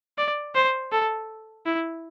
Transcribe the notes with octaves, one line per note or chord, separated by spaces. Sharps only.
D5
C5
A4
E4